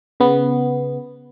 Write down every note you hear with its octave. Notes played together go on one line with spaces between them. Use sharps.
C#3 B3